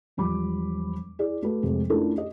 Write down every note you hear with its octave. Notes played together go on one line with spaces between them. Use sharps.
E1 F3 G3 B5 D6
E4 G#4 D5
A3 F#4 B4
F1 C3 G#3 A3
A3 C#4 D4 E4 F4 A#4
G4 D#5